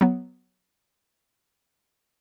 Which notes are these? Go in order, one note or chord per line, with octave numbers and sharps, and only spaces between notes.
F#3 B3